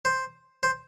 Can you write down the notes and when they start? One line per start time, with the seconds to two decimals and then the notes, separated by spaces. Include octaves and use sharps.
0.05 C5
0.63 C5